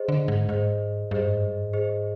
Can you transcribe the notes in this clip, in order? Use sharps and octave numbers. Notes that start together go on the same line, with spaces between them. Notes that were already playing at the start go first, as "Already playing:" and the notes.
Already playing: G#4 C5 D#5
D3
G#2
G#2 G#4 C5 D#5
G2 G#4 C5 D#5
G#2
G2
G#2
G#4 C5 D#5